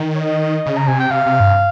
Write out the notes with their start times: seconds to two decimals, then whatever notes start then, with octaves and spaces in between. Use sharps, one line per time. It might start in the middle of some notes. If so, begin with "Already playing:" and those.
Already playing: D#3
0.15 C#5
0.20 D#5
0.66 C#3
0.77 A#5
0.87 C3 G#5
1.00 G5
1.11 C3 F5
1.26 C3
1.40 G2